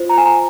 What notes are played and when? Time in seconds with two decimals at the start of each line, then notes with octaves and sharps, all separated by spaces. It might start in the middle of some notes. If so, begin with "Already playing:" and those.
Already playing: F4 C5
0.09 A#5
0.18 G#5
0.25 A#5